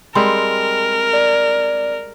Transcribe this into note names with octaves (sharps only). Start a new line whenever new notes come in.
G3 G#3 C4 A#4
D5